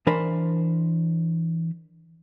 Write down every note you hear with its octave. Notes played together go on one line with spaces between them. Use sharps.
E3 D4 A#4 C5 B5